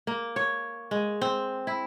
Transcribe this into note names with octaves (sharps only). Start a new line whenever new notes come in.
A#3
C#5
G#3
C4
E4